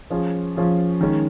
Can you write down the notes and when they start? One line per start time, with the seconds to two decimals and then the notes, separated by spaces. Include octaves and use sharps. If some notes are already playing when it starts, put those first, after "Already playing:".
0.10 F3 C#4 F4 G#4
0.56 F3 C#4 F4 G#4
1.01 D#3 G#3 C#4